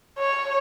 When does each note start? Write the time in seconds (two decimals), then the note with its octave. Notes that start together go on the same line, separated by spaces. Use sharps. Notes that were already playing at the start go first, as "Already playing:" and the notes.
0.19 C#5